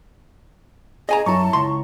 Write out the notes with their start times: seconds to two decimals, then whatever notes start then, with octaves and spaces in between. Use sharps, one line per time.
1.09 G#4 D#5 G#5 A#5
1.26 F#2 E4 A5 A#5 C#6
1.53 C#2 C6